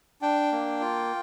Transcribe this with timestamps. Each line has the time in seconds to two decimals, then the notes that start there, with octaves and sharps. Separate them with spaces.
0.21 D4 G5
0.52 A#3
0.81 F4